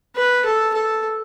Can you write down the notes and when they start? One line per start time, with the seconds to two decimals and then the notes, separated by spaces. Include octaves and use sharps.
0.16 B4
0.45 A4
0.74 A4